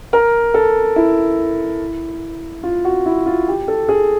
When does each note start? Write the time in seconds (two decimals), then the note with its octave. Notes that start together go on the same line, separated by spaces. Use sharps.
0.13 A#4
0.54 A4
0.96 E4
2.63 F4
2.85 F#4
3.06 E4
3.26 F4
3.48 G4
3.68 A4
3.89 G#4